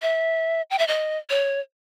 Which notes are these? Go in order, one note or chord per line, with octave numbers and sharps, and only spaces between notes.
E5
G5
E5
D#5
C#5